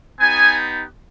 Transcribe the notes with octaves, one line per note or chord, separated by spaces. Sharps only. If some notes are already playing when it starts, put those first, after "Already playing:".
B3 D#4 G4 G#5